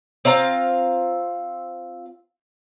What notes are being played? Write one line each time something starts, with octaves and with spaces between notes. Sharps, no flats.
C4 F4 F5 A#5